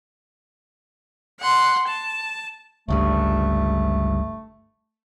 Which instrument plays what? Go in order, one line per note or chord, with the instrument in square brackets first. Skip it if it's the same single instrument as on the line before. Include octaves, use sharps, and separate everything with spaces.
[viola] F#5 C6
A5
[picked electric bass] G1 C#2 G2 [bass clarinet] A3